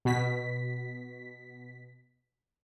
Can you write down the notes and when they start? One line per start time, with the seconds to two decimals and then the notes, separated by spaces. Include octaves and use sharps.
0.05 B2 B6